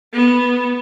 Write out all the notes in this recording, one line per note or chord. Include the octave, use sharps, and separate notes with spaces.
B3